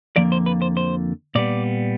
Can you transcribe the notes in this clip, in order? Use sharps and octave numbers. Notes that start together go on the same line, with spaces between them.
F2 D3 F3 A#3 D5
C5
B4
C5
C5
A#2 G3 B3 D5